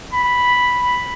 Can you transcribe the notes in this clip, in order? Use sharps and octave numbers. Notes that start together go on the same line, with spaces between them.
B5